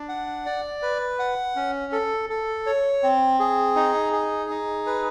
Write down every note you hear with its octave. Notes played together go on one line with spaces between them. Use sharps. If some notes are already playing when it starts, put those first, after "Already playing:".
Already playing: D4
F#5
D5
B4
F#5
C#4
A4
A4
C#5
C4
G#4
D#4
G#4
D#4
B4